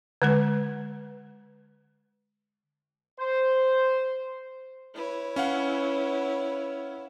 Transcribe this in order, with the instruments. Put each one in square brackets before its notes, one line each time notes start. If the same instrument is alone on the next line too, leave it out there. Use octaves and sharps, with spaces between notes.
[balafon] D3 G#3 B4
[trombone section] C5
[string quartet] E4 B4 C#5
[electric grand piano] C#4 F5 F#5